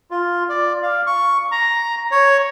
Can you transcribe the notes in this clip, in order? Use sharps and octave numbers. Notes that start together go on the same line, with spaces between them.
F4
D5
F5
C#6
A#5
C#5